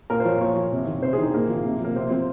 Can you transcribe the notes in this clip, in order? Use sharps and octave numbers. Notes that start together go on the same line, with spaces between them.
A#2 A#4
C5
F3 C#5
A#2 C#5
F3
C3
D#3
C3 C5
G#4
D#3 D#4
A#2 A#3
F3
C3
F3 A#3
C3 C4
F3 C4